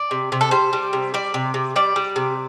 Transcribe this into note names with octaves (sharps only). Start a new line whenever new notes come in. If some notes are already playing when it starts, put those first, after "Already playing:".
Already playing: D5
C3
C3
A4
G3 C5
G3
C3
G3 D5
C3
C3
G3 D5
G3
C3